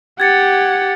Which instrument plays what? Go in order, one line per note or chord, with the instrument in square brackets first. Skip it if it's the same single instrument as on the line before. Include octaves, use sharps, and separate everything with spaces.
[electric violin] G4 F#5 [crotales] G#6 A6 C#7